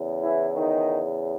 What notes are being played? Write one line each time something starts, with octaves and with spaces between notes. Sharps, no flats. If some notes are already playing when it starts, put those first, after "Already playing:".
Already playing: E2 C#3
E3 E4
D#3 D#4